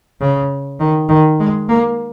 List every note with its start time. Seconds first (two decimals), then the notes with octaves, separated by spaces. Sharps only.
0.20 C#3
0.80 D#3
1.09 D#3
1.40 G#3
1.69 A#3